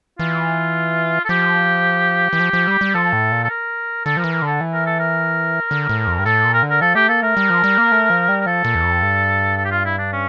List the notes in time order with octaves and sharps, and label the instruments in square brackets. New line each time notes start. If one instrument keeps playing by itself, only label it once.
[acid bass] E3 [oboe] F4
[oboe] A4
[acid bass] F3 [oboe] G4
[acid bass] E3
F3
F3
G3
G3
[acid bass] F3 [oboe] A4
[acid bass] A2
A#2
[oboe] A4
A#4
[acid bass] D3 [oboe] A4
[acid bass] F3 [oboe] A#4
[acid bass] E3
[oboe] A#4
[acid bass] D3 [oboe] A4
[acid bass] E3
[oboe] A#4
A4
A#4
[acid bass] D3
A2
F2
G2
[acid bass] A2 [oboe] A4
[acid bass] A#2
[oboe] A#4
[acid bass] D3
[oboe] A#4
[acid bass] F3 [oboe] A4
[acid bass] A3 [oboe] G4
[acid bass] A#3 [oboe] A4
[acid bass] A3 [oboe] A#4
[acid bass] G3
F3
G3
A#3
A3
F3
G3
[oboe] A#4
[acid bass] F3 [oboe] A4
[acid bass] A#2
E2
F2
G2
[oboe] A4
G4
F4
E4
D4
C#4